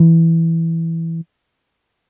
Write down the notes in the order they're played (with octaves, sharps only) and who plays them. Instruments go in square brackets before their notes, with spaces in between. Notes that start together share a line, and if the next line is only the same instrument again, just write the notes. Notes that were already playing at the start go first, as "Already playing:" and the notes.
Already playing: [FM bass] E3